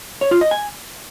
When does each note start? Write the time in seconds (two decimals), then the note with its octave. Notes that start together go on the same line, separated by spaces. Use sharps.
0.21 C#5
0.31 F4
0.41 D#5
0.51 G#5